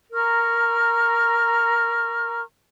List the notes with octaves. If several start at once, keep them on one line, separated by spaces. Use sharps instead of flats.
A#4 A#5 C#6 F6